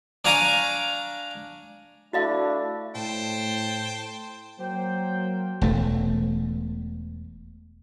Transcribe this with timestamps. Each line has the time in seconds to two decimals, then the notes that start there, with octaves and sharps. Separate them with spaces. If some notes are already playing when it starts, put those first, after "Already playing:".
0.25 D4 C#5 F5 G#5 A#5 D6
2.13 A3 D4 E4 F#4 D#5 F5
2.96 A2 C5 G5 A5
4.59 F#3 A#3 C5 G5
5.62 E1 A3